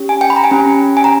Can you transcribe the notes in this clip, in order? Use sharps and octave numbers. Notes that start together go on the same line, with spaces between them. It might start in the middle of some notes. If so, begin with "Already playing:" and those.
Already playing: C#4 G4
G#5
G5
B5
A#5
G#5
C#4 G4 G5
G#5
A#5